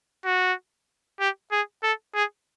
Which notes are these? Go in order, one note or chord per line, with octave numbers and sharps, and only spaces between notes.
F#4
G4
G#4
A4
G#4